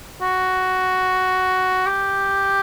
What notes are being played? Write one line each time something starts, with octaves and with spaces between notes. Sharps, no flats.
F#4
G4